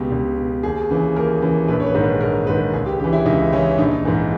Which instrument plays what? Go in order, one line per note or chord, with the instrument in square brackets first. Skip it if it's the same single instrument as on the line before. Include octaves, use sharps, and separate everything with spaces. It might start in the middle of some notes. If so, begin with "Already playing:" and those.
Already playing: [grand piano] C#2 B2 G4
C#2
B2
D#2 G#4
C#3 E3
D#2 A#4
C#3 E3
A#1 B4
C#5
B4
G#2 D#3
B4
A#1 A#4
G#2 D#3 B4
C#2 G#4
G4
C#3 E3 G4
E4
C#2 D#4
C#3 E3 C#4
A#1 D#4
G#2 E3